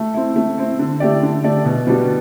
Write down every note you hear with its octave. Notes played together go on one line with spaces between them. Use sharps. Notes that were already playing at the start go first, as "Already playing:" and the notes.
Already playing: A3
C4 E4
A3
C4 E4
D3
A3 E4 G4 D5
D3
A3 E4 G4 D5
B2
G3 B3 D4 F#4